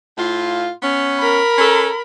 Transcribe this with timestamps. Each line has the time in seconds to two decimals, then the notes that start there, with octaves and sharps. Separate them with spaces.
0.17 A2 F4
0.82 B3 C#4
1.20 A#4 B5
1.58 C#4 A4